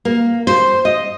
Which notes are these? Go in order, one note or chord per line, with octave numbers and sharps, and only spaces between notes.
A#3
C5
D#5